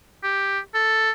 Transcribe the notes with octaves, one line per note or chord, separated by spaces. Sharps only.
G4
A4